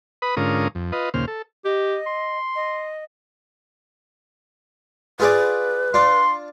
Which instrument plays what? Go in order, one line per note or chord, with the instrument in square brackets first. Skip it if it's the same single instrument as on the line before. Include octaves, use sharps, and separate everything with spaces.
[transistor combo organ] B4 B5 D#6
G#2 D3 C#4 F4 A#4 D#6
F2
F4 B4 D#5
D#2 A#2 C#3 C5 F6
A4
[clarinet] G4 [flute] D#5
[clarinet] C6
[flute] D#5
[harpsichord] F4 G#4 D5 [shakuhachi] B4
[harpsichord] D4 F4 [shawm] C6